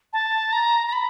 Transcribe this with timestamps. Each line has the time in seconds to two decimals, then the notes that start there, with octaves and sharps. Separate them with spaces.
0.13 A5
0.53 A#5
0.87 A#5
0.92 B5